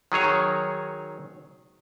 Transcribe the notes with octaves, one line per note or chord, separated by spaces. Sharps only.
D#3 F#3 G#4 C#5